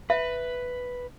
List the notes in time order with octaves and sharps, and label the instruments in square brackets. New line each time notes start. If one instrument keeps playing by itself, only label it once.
[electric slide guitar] B4 [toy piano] E5